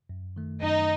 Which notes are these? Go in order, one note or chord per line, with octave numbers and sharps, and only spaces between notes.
F#2
D#3 A3
F#2 D#4 D#5